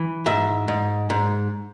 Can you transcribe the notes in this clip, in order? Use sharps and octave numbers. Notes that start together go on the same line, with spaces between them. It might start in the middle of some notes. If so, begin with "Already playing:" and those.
Already playing: E3
G#2 E5
G#2
G#2